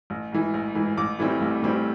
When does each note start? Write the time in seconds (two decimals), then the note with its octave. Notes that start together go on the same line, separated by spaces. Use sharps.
0.10 A1
0.32 G#2 E3
0.54 A1
0.75 G#2 E3
0.97 A1 D6
1.19 A2 E3 G3 C4
1.41 A1
1.62 A2 E3 G3 C4